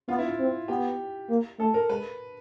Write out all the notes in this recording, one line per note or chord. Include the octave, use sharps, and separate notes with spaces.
B3 F4
E4
F4
C4
B3 G4
A#3
A3 A4
A#4
G#3 B4